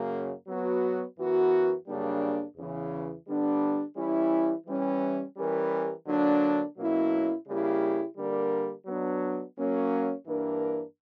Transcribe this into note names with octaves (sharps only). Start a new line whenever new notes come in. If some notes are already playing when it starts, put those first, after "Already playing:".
Already playing: F#2 C#3 F#3 A#3
F#3 B3 F#4
F#2 E3 B3 F#4 A#4
F#2 C#3 G3 A#3 D4
E2 C#3 E3
D3 G3 B3 D4
E3 G3 C#4 E4
E3 G3 C#4
E3 G3 C#4 G4 A#4
D3 F#3 A#3 D4
B2 F#3 A#3 C#4 E4
C#3 G3 A#3 E4 G4
D3 G3 A#3 D4 A#4
F#3 B3 D4
F#3 A#3 C#4
G2 E3 A#3 D4 A#4